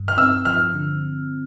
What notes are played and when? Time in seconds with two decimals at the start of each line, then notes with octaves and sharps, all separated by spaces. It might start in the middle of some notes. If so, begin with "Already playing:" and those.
Already playing: G2
0.08 F6
0.17 C4 E6
0.45 F3 F6
0.74 D3